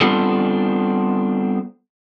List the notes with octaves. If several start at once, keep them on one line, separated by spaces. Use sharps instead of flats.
G3 B3 C4 D4 F4 A4